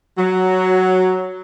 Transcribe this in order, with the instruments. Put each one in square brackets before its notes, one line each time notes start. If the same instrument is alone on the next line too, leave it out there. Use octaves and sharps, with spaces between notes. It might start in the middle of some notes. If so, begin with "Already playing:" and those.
[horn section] F#3